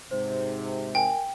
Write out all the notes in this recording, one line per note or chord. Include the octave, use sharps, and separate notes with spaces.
G#2 C3 C5
A#4 G5 G#5